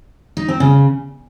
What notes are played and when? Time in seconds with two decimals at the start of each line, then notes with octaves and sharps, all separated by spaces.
0.37 D#4
0.48 C4
0.60 C#3